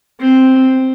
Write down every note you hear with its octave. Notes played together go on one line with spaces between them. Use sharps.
C4